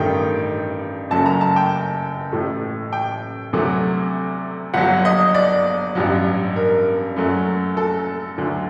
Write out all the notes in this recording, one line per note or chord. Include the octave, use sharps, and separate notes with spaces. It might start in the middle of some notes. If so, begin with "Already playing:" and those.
Already playing: A1 G2 D#3 A3 G5
F#1 F#2 F#3 A3 A5
A#5
A5
G5
A1 A2 A3
G5
D2 C3 F#3 A3
G1 G2 F#3 F#5
D#5
D5
A1 G2 F#3
A#4
F#2 F#3 A3
A4
D2 D3 F#3